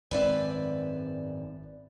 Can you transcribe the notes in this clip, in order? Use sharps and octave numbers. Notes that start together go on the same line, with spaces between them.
G#1 F#2 C4 B4 D5 E5